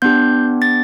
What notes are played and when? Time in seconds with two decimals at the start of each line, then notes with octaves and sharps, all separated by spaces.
0.02 B3 D4 G4 G6
0.62 A6